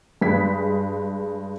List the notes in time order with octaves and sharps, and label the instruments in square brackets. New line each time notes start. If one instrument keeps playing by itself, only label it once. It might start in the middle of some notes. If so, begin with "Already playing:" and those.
[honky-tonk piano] G2 G#3 G#4 B6